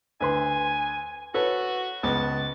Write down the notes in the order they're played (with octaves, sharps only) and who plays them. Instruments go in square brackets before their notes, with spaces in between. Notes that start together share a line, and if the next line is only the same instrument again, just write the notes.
[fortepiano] D2 B4 C6 [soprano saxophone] G#5
[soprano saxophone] F#4 [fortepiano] A4 B4 C#5
[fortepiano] C#2 B3 [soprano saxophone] A5